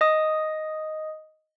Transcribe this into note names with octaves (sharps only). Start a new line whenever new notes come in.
D#5 D#6